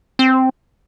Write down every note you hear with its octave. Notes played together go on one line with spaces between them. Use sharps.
C4